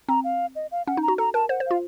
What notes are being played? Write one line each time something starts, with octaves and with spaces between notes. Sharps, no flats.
C4 A#5
F5
D#5
F5
C#4 F#5
D#4
A#5
F#4
A4 A#5
A#4 A5
C5 F#5
C5
F4 F5